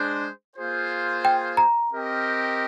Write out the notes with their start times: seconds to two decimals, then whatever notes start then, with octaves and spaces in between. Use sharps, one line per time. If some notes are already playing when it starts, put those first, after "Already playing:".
Already playing: G#3 D4 G#4 C5
0.56 A#3 F4 G#4 C5
1.25 G5
1.57 A#5
1.91 C4 G4 A#4 D#5 G5